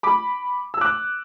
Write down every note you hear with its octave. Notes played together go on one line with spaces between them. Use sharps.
B5 D6
E6
D6 F#6